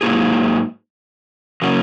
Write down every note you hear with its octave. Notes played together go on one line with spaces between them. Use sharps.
G#2 F#3 A#3 D#4 G#4
C#3 F#3 A#3 C#4